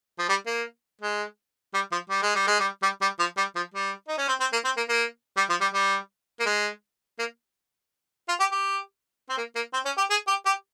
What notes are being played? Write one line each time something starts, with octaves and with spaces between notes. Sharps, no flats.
F3
G3
A#3
G#3
G3
F3
G3
G#3
G3
G#3
G3
G3
G3
F3
G3
F3
G3
D#4
C#4
C4
C4
A#3
C4
A#3
A#3
G3
F3
G3
G3
A#3
G#3
A#3
F4
G4
G4
C4
A#3
A#3
C4
C#4
G4
G#4
G4
G4